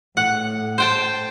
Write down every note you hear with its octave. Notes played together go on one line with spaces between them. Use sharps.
A2 F#5
C5 G5 A5